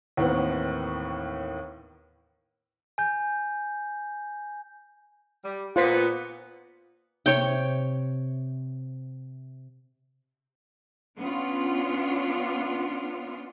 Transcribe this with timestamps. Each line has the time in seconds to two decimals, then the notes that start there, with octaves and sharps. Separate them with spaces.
0.17 D#2 A2 D#3 E3 B3 C4
2.98 G#5 G6
5.45 G3
5.76 A#2 B3 F4 C5 B6
7.26 C3 C#5 G5
11.20 B3 C#4 D4 F4